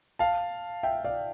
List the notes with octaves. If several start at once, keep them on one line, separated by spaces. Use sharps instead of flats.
F5 A5
E5 G5
D5 F5